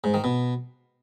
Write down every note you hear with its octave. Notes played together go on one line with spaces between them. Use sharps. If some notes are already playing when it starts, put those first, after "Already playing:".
G#2
D#3
B2